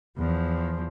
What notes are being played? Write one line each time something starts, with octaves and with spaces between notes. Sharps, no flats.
E2 F3